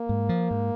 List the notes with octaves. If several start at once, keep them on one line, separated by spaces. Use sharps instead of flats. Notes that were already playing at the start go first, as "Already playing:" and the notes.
Already playing: A#3
G#2
F3
G#2